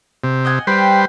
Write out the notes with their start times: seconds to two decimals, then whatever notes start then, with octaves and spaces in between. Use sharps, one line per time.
0.24 C3
0.45 D#5 F#5 G#5
0.67 G3 F#4 G4 B4 C5